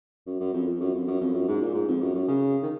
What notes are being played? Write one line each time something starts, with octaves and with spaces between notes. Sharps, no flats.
F#2
F#2
F2
F2
F#2
F2
F#2
F2
F#2
G#2
A#2
G#2
F2
F#2
F#2
C#3
D#3